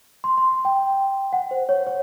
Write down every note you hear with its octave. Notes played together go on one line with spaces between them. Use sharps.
C6
C6
G5
F#5
C5
C#5
C#5